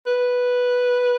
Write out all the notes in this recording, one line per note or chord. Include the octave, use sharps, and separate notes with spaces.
B4